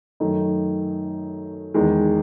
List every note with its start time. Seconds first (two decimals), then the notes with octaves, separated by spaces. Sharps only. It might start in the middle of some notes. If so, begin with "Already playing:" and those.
0.20 F#2 D#3 A3 D#4
1.74 E2 D#3 G#3